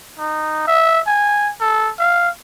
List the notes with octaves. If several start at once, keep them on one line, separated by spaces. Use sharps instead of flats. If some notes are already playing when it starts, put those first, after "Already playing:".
D#4
E5
G#5
A4
F5